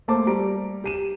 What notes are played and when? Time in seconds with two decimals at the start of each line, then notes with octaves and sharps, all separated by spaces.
0.08 A3 A#3 C5 A5 D6
0.27 G3 A#5 D7
0.84 G4 D#7 E7